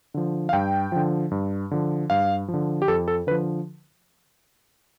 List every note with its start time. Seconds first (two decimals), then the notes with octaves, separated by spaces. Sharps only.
0.14 D3 F3
0.49 F5
0.53 G2 G5
0.92 D3 F3
1.31 G2
1.71 D3 F3
2.10 G2 F5
2.48 F3
2.54 D3
2.82 G4
2.88 F2 A4
3.08 A4
3.27 D3 B4
3.31 F3